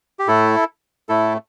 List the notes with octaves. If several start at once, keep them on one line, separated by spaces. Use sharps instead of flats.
G4
A2 A3 E4 A4
A2 A3 E4 A4